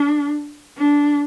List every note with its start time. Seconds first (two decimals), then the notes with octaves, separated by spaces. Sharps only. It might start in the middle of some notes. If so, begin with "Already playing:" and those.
Already playing: D4
0.78 D4